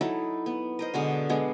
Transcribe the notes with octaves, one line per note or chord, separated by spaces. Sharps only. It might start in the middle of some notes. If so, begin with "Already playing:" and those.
F#3 D#4 E4 A4
B3
A#4 C5 D#5
B2 D3 G#3 F#4
G#3 B3 D4